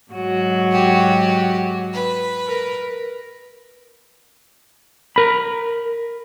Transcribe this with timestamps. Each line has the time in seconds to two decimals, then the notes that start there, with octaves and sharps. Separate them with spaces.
0.12 G#2 F#3 F#4
0.72 G4
1.94 B4
2.48 A#4
5.16 A#4 B5